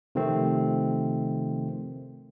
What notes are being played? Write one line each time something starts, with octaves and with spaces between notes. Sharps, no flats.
C3 D#3 F3 A3 C4